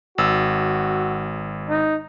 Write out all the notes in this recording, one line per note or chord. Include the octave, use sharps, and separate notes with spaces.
G#1 F#4 E6
D#4